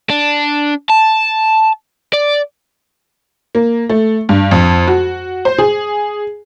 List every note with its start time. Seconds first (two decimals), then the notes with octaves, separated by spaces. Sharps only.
0.10 D4
0.89 A5
2.14 D5
3.55 A#3
3.89 A3
4.29 G2
4.51 F2
4.88 F#4
5.45 C5
5.58 G#4